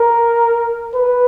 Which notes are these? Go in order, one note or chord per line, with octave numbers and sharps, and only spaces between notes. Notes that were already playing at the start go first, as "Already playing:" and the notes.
Already playing: A#4
B4